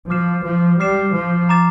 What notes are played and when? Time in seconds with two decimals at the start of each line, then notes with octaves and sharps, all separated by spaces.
0.10 F3 D6 F6 C7 E7
0.45 F3
0.80 G3 D6 F6 C7 E7
1.14 F3
1.49 A#5 D6 A6 E7